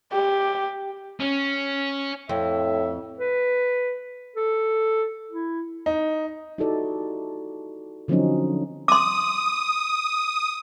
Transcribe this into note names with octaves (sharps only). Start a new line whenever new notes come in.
G4
C#4
F2 A2 E5
B4
A4
E4
D#4
D#4 E4 F#4 G4 A4 D5
D3 F3 F#3 C4 C#4 D#4
C6 D6 D#6